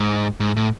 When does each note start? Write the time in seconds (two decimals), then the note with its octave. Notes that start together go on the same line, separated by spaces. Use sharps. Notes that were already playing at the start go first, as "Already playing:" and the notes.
Already playing: G#2
0.40 G#2
0.56 A2